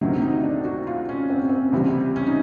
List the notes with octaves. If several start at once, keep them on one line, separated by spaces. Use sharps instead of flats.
D2 C3 D#3 F#3 E4
D#4
D4
F#4
F4
C#4
C4
C#4
C4
C#2 C3 E3 G3
C#4
D#4